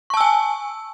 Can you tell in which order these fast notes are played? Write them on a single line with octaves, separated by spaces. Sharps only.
C#6 A5 E6 G#5